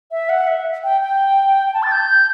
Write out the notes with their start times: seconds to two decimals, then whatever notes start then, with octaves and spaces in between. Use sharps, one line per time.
0.11 E5
0.29 F#5
0.47 E5
0.84 G5
1.01 G5
1.67 G5
1.74 A5
1.83 A6
1.92 G6